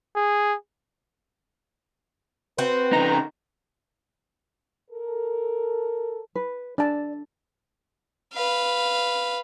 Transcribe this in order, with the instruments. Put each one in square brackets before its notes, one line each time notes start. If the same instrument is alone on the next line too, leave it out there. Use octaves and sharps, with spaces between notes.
[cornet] G#4
[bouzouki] C4 F#4 [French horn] B4
[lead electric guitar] C#3 D#4 [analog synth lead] A#5
[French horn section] A4 A#4
[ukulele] B4
[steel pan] D4 A5 [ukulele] D5
[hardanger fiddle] B4 F5